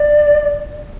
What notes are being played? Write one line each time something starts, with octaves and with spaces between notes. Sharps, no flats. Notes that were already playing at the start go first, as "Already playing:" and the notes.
Already playing: D5